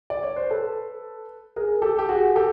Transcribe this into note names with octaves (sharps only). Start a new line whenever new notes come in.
D5
C#5
C5
A4 B4
G#4 A#4
G4 A4
G4
F#4 G#4
G4 A4